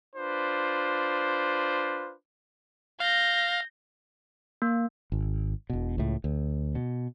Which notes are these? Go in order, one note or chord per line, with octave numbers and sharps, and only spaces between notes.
D4 F4 B4 C5
F5 G6 A#6
A#3
G#1
E1 B2
C#2 A2
D2
B2